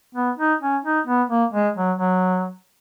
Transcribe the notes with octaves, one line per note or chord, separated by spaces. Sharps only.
B3
D#4
C#4
D#4
B3
A#3
G#3
F#3
F#3